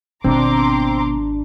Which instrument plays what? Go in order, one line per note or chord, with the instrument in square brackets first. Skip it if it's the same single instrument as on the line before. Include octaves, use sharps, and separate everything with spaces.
[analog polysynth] G#1 D4 [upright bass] B2 B3 [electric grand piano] C4 [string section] A#5 C6 D6